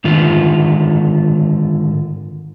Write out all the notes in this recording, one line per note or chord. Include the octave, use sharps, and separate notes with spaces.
G#2 D3 D#3 F4